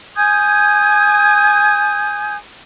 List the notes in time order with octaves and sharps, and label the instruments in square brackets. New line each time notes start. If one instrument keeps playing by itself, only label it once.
[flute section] G#5 D#6 G6 G#6